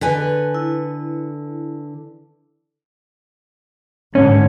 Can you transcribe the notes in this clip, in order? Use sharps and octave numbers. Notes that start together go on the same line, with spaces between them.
D3 B4 G#5
E4
G#2 D3 C#4